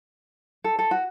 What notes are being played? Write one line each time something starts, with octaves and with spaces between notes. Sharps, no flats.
A4
A4
F#4